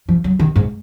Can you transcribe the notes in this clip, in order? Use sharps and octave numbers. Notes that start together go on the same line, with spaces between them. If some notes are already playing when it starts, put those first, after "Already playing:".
F3
F#3
D#3
G#2